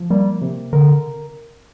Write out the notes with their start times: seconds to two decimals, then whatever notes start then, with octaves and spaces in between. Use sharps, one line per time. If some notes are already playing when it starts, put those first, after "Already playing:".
Already playing: F3
0.10 G3 A#3
0.41 C3
0.73 D3 A#4